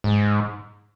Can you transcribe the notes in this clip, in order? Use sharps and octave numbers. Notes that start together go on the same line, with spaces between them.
G#2